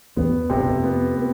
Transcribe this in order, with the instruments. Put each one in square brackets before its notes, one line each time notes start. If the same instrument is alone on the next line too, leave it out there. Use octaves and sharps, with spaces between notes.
[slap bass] E2 G2 [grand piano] B3
[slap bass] F2 [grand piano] C3
[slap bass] G2
F2
[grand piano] B3
B3